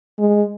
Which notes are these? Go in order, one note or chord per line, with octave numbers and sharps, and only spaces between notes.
G#3